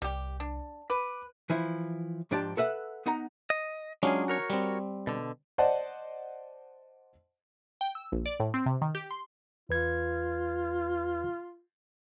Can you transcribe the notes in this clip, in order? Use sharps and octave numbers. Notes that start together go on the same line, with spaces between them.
C2 G3 G4
D4
B4 D6
E3 F3 E4
G#2 F3 D4 G4 D5 A5
A4 B4 E5 F#5
B3 D#4 F#5 A#5
D#5
F#3 G#3 C#4 D4 F4 G#4
F#4 A#4 C#5
G3 C4
B2 D3
C5 D5 D#5 F#5 A5
G5
E6
A#1
D5
A2
C4
C3
D#3
G4
C6
E2 F4 B4 G#6